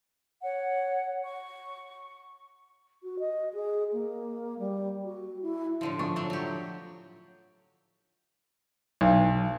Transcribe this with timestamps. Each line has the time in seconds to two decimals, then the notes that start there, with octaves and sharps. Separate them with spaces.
0.42 C#5 F#5
1.23 C#6
3.03 F#4
3.19 D#5
3.54 G#4
3.92 A#3
4.59 G3
5.04 F#4
5.42 E4
5.81 A2 D3 F3
5.99 F3 D4 C#6
6.16 F#3 A3 D4
6.30 F#3 G4
9.01 B1